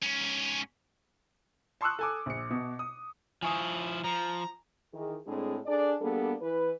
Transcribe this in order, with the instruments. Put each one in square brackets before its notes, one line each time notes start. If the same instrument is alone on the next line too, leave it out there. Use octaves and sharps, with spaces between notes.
[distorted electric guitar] G#2 C#4
[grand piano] A5 C6 C#6 D#6 E6 F#6
A4 G#5 D6
A#1 C#7
B2
D#6
[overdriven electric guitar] F3 E4 [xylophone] G#5 C#6 D#6
[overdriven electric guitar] F3 [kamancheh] A#5
[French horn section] D#3 E3 G#4
A2 G#3 C4 D4 G#4
D4 G#4 A4 D5
G3 A#3 B3 D4 G#4 A4
E3 B4